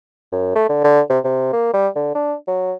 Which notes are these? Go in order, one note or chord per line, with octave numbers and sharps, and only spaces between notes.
F#2
A3
D3
D3
C3
C3
A#3
G3
D3
D4
F#3